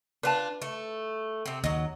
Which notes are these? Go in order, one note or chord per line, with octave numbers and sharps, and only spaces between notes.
D4 F4 B4 A5
A3
C3 C4
D#2 F#3 D#5